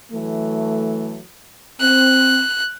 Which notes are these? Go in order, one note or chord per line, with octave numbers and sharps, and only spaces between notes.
E3 F#3 A3
C4 F#6